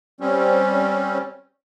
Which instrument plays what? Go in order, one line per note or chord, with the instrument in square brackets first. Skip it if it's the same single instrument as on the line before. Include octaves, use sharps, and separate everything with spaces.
[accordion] G3 C4 C#4